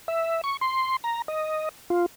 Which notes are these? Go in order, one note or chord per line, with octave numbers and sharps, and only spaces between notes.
E5
C#6
C6
A#5
D#5
F4